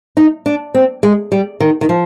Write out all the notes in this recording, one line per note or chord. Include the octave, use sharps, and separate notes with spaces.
D#4
D4
C4
G#3
G3
D#3
D#3
F3